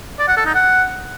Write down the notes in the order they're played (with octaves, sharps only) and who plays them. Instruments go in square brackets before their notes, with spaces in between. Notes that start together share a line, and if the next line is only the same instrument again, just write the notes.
[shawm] D5
F#5
A4
D#4
F#5